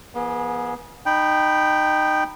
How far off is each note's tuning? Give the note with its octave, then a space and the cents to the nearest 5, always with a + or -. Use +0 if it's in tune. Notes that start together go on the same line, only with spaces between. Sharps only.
E3 +35 B3 -40 G#4 +0
D#4 -25 G5 +0 B5 +0